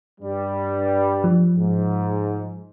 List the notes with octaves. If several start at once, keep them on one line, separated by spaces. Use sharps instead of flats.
G2 G3
F3
G#2